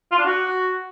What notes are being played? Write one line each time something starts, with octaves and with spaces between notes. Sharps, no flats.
F4
D4
F#4